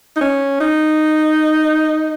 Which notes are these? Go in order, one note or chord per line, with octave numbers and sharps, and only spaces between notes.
D#4
C#4
D#4